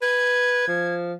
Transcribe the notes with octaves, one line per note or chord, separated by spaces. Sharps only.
B4 G#6
F3